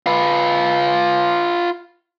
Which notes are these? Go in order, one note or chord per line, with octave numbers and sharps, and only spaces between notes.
F4 B4